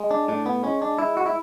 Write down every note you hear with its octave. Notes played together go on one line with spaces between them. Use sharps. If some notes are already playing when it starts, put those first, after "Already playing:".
Already playing: G#3
D4
A2 D4
B3
G#3 C#4
D4
G#3 E4
F#4
E4